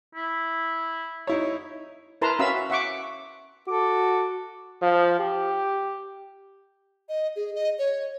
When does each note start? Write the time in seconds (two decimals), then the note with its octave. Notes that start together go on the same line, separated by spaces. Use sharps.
0.15 E4
1.27 D#4 E4 C#5
2.22 E4 A#4 B4 A5 A#5 C6
2.39 C#4 F#4 E5 F5 B5 E6
2.70 E5 F#5 C#6 D6
3.68 F#4 A4 D6
4.82 F3
5.19 G4
7.09 D#5
7.36 G#4
7.55 D#5
7.79 C#5